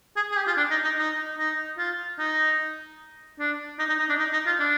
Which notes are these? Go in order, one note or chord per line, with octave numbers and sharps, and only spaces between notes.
G#4
G#4
G4
F4
D4
D#4
D#4
D#4
D#4
F4
D#4
D4
D#4
D#4
D#4
D4
D#4
D#4
F4
D4